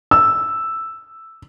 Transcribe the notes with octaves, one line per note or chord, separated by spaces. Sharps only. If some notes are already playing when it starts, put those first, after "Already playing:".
E6